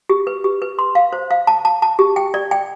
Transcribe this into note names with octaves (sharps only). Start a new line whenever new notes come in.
G4
B4
G4
B4
C6
F5
C5
F5
A5
A5
A5
G4
G5
D5
G5